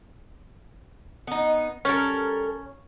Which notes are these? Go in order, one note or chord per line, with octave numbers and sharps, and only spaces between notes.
B3 D#4
G3 C#4 A4 A#4